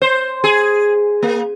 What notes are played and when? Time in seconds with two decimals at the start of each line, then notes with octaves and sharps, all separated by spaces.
0.02 C5
0.44 G#4
1.23 A#3